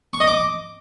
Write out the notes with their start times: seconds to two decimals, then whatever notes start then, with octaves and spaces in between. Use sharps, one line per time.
0.13 C#6
0.20 D#5
0.27 D6